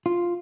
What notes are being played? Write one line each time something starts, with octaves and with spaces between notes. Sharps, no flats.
F4